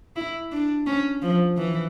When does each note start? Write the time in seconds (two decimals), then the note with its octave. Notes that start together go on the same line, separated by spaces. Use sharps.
0.16 E4
0.52 D4
0.87 C#4
1.22 F3
1.57 E3